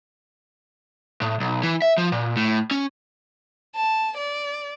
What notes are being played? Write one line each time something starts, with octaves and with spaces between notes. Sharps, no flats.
A2
B1
E3
E5
F3
A#2
A2
C#4
A5
D5